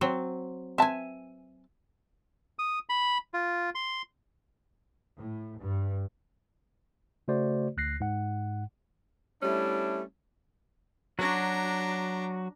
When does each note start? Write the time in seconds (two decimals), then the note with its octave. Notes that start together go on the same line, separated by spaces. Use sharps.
0.01 F#3 C4
0.78 C4 B4 E5 G#5 A5
2.59 D#6
2.89 B5
3.34 F4
3.75 C6
5.17 A2
5.59 G2
7.28 C#3 A3 F#4 C5 D5
7.77 D2 F#6 A#6 C7
8.00 G#2 F#5
9.43 G3 A3 C#4 D4 E4
11.19 F#3 D4 F#4 A#5